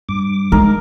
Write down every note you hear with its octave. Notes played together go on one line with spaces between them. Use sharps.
G2 D6
G#3 D#4 A#4